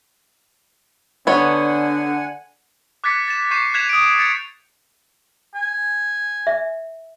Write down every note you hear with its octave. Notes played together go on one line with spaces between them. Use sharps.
D3 B3 C#5 F#5 G#5
D6 F#6 G#6 A6 B6 C#7
A6 E7
C#6 G6 C7 D#7 E7
F#6 G#6 B6 E7 F7
D#6 D7
A6 C#7 F7
G#5
E5